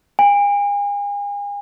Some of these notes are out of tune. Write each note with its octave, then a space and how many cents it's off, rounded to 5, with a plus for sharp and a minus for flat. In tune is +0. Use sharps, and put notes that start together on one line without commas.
G#5 -40